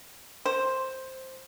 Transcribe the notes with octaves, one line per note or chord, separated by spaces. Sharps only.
C5